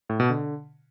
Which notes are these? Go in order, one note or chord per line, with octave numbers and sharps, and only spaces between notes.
A2
B2
D3